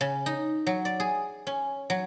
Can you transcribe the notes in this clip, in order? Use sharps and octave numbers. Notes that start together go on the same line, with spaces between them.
C#3
D#4
F#3
D5
G#4
C#4
F#3